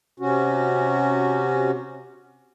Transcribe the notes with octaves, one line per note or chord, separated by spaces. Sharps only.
C3 C#4 F#4